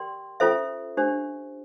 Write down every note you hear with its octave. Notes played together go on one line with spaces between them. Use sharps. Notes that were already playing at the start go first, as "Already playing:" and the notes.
Already playing: G4 A#4 D5 G5 C6
C#4 F4 A4 C5 E5
D4 G4 C5